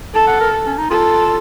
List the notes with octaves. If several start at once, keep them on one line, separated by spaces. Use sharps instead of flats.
A4 A5
F#5
A#4
C#4
D#4
F4 A4